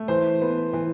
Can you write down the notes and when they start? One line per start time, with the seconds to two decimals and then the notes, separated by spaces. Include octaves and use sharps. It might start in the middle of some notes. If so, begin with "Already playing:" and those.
Already playing: A3
0.08 E3 C5 C6
0.42 B3
0.73 E3